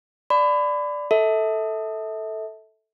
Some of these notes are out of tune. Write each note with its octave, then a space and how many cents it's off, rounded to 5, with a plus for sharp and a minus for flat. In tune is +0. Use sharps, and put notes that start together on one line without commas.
D5 +0 B5 +30
A4 +0 E5 -30